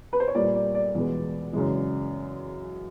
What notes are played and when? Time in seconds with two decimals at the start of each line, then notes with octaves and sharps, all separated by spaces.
0.13 B4
0.20 C5
0.28 C#5
0.35 A#2 G3 A#3 D5
0.55 D5
0.75 D5
0.95 E2 B2 G#3 B3
1.53 F#2 C#3 E3 G#3